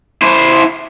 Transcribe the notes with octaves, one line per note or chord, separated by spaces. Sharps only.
E4 C5